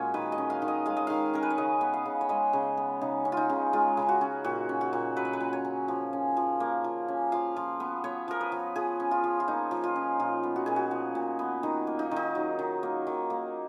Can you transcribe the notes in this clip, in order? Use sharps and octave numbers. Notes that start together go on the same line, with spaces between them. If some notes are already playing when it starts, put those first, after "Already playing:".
Already playing: A#2 G#3 C#4 F#4 G#4
D#3 B4
D#5
C#4
F5
D#3
D#5
G#3 F5
D#5
D#3 F5
C#4 A#4
B4
C#5
C#3 D#5
B3
F5
C#3
C#5
G#3 D#5
C#3
B3
C#3 D#4
C#4
D#4 F4
C#3
G#3 F4
C#3
F#4
C#4
A#2 F#4
C#4
F#4
A#2
F#3 B4
C#5
B4
A#2
C#5
C#4
F3
C#4
F3
A#3
F3
C#4
F3 F5
F3
B3
B3 C#5
F3 A#4
B4
F3
F3 G#4
C#4
F4
F3
F4
A#3 D#4
F3
F4
C#4
A#2 F4
B3
F#4
A#2 G#4
F#4
F3
A#2
B3
D#3 D#4
A#3
D#4
D#3 D#4
F#3
D#3
A#3
D#3
A#3